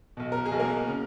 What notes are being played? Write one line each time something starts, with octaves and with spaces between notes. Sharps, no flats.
B1 B2
A#4
G#4
B1 B2
A#3 A#4
C#3